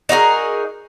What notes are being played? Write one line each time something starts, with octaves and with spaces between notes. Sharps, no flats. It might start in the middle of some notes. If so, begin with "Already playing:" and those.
D#4 F#4 G#4 A#4